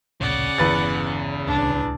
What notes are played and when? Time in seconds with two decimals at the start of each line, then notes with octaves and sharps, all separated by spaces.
0.21 D1 A#1 C#3 D5 F#5
0.58 G1 E2 B4 A6
1.47 D1 C2 D4